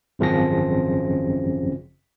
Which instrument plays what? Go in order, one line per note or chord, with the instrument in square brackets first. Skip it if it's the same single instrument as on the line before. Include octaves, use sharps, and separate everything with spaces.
[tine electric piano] G#1 F#2 C#3 F3 C4 A#6